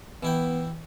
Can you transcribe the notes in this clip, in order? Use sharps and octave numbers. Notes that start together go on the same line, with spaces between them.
E3 B3 E4 G5